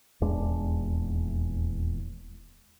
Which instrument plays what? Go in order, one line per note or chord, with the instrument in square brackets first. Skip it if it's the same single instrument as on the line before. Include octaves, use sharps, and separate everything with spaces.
[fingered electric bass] D#1 E2 G#3 D4